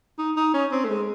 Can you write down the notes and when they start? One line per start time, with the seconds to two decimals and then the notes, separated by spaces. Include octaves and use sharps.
0.19 D#4
0.37 D#4
0.54 C#4
0.72 C4
0.85 A3
0.89 G#3